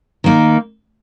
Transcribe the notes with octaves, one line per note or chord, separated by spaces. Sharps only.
D#3 A#3 D#4